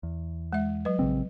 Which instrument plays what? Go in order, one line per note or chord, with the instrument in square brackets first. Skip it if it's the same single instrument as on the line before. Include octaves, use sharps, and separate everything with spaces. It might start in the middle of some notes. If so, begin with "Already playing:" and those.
[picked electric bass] E2
[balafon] G#3 E5
F#3 B4
[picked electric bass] A#1 C#3 C4